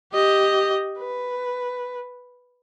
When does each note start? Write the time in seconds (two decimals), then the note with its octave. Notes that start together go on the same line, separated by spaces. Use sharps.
0.13 G4 D#5
0.99 B4